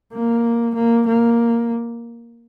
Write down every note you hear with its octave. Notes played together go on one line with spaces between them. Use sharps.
A#3
A#3
A#3